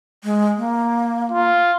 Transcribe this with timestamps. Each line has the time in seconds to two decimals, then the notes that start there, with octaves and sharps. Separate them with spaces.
0.24 G#3
0.57 A#3
1.32 F4